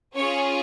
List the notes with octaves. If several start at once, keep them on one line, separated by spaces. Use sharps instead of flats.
C#4 F4 G#4 C#5